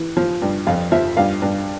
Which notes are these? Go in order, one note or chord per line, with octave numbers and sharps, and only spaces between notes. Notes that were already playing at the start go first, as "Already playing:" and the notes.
Already playing: E3
F3
G2
F2 F5
F3 E5
G2 F5
G2